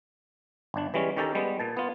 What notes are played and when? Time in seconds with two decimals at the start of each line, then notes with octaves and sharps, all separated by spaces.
0.74 G1 D4
0.94 E3 G3 G#3 C#4
1.17 D#3 C#4 G4 A4 A#4 A5
1.35 G3 G#3 B3
1.60 A#2 A5
1.77 B3 F4